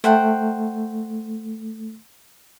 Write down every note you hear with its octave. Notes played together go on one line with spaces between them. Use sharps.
A3 C5 F#5 G5